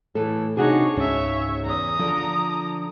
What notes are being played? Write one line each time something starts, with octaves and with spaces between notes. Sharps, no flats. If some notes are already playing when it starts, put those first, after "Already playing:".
A2 E3 A4
C3 D4 D#4 F#4 G#4 C#5
C#2 G#2 C#3 C#4 C#5 E5
E2 A#5 D#6
D3 F3